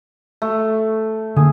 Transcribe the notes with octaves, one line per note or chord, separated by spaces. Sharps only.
A3
D3 A#3 G#4